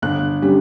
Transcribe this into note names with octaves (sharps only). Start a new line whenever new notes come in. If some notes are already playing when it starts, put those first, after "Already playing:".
G1 F#6
D3 G3 C#4